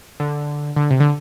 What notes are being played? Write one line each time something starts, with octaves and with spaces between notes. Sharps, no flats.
D3
D3
C3
D3